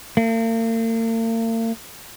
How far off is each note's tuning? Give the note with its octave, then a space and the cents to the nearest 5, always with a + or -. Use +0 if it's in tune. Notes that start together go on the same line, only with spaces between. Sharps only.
A#3 -45